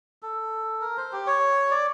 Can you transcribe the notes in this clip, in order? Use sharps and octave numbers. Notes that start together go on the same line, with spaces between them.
A4
A#4
C5
G4
C#5
D5